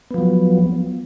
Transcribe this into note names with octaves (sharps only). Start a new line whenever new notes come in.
F3 F#3 B3